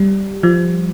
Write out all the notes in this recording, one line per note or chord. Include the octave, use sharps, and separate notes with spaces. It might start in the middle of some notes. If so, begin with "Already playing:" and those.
Already playing: G3
F3